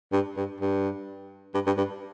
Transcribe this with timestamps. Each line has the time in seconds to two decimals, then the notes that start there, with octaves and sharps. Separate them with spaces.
0.12 G2
0.37 G2
0.60 G2
1.54 G2
1.67 G2
1.77 G2